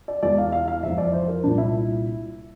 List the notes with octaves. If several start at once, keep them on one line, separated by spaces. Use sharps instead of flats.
D5
E2 E3 D5
F5
F5
F5
F2 E3 E5
D5
C5
A#4
C2 A#2 D4
E4